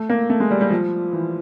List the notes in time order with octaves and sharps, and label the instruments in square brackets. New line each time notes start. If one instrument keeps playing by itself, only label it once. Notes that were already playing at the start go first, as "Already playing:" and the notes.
Already playing: [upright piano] A3
A#3
A3
G#3
G3
G3
F3
E3